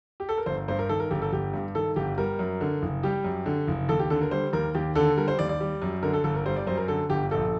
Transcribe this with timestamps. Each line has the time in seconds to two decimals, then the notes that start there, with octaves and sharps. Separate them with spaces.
0.20 G4
0.29 A4
0.38 A#4
0.46 G1 C5
0.68 G2 C5
0.79 A#4
0.89 D#3 A4
1.00 A#4
1.10 G1 G4
1.22 A4
1.32 G1 G4
1.53 G2
1.75 D#3 A4
1.96 G1 G4
2.18 G3 A#4
2.39 F#2
2.61 D3
2.82 F#1
3.03 G3 G4
3.24 F#2
3.46 D3
3.68 F#1
3.89 D#2 A4
3.99 G4
4.10 D3 A4
4.21 A#4
4.31 G3 C5
4.53 D#2 A#4
4.75 D#2 G4
4.95 D3 A4
5.17 G3 A#4
5.28 C5
5.39 D#2 D5
5.49 D5
5.60 G3
5.82 F#2
6.03 D3 A#4
6.14 A4
6.24 G1 A4
6.35 A#4
6.46 G3 C5
6.56 D5
6.67 F#2 C5
6.77 A#4
6.88 D3 A4
7.09 G1 G4
7.31 A#1 A4